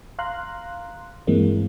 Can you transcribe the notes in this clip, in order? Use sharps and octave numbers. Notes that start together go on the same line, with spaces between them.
F5 A#5 C6 F#6
G2 E3 G#3 A#3 C4